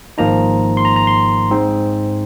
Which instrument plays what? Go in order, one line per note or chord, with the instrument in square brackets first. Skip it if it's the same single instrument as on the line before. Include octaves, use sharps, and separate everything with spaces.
[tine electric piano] G#1 G#2 F3 A#3 D#4 A#5
C6
A#5
A#5
C6
G#2 G#3 C4 D#4